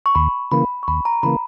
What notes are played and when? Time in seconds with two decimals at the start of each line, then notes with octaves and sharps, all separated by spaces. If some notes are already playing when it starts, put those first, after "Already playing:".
0.06 C#6
0.15 D#2 B5
0.51 C#3 E3 A#3 B5
0.83 C#6
0.88 D#2 B5
1.05 A#5
1.23 C#3 E3 A#3 B5